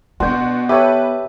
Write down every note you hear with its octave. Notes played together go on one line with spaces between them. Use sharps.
B2 B3 D4 F#4 C6 G6
G4 A4 B4 C#5 E5